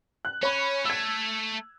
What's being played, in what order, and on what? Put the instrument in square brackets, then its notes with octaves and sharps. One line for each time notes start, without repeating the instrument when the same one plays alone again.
[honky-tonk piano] F#6
[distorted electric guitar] C#4 [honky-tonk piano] C#5 B5
[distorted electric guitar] A3 [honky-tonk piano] E6 G#6